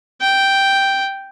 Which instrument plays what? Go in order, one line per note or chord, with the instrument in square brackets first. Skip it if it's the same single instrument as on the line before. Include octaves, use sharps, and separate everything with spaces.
[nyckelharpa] G5